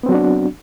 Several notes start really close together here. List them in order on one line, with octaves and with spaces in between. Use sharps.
B3 C4 F#3 F#4 D4